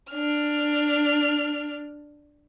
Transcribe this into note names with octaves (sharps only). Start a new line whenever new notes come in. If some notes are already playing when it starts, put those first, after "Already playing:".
D4 F6